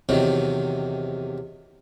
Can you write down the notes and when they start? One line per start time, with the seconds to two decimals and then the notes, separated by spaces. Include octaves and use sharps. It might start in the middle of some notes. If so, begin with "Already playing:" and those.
0.09 E2 C3 D#3 F#3